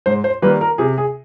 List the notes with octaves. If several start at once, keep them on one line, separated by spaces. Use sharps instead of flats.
G#2 C5
C5
D#3 G3 A#3 B4
A#4
C3 G#4
G#4